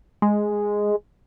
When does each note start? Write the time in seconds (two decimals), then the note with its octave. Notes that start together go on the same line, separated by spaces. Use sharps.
0.22 G#3